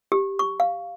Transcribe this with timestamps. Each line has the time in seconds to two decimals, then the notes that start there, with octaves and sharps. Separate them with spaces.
0.12 G4
0.39 C#6
0.60 F5